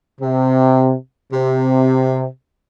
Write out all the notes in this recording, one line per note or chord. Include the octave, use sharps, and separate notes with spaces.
C3
C3